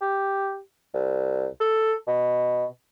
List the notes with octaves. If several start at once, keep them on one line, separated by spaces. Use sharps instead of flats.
G4
C2
A4
B2